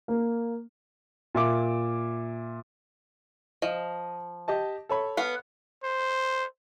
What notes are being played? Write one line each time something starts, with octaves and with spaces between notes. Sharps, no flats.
A#3
A#2 E5 D6
F3 D#5
G4 D#5 A5
A4 C#5 B5
B3 F5
C5